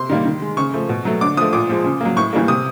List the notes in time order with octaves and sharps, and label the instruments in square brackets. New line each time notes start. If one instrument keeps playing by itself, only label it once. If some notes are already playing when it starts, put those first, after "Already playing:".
Already playing: [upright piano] C3 C6
D#3 G3 A#3
D#3
G#3
C#3 C#6
F3 A3
B2
F#3 A3
D3 D6
F3 A3 D#6
A#2 D6
F3 G#3
C#3
F#3 A#3
A2 C#6
E3 G3 A#3
C3 D#6